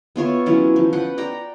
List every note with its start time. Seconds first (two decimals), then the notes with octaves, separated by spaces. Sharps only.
0.16 B3 F4 C#5 E5
0.46 E3 F#3 C#4 E4
0.76 F3
0.93 B4 F#5 G5
1.18 D5 G5 A#5